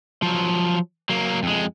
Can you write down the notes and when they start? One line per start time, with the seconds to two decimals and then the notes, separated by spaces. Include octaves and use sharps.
0.22 F3 F#3
1.09 F#3 A#3
1.43 F2 G#3